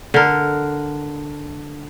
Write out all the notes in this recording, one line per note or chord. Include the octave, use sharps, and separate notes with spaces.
D3 A#4